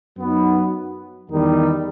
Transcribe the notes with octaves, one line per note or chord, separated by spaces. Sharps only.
F#2 F#3 B3 D#4
E2 D#3 G3 D#4